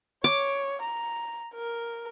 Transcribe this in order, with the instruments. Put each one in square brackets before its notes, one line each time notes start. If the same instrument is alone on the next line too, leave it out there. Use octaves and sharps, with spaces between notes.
[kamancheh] C#5 [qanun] D6
[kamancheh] A#5
A#4